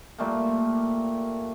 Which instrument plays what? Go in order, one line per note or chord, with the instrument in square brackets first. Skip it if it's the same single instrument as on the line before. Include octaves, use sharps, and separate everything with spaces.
[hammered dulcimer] A#2 G3 A3 A#3